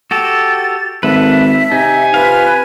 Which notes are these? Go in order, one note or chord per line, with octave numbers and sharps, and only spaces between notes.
F#4 G4 A4 A6
G#1 A4 B4 E5
C3 D#4 G#5
F4 B4 F5